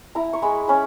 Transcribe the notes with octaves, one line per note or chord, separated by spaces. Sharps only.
E4 A#5
C#6
G#3 B5
C#4 B5